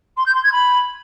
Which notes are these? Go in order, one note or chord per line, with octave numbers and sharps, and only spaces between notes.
C6
G6
C6
G#6
B5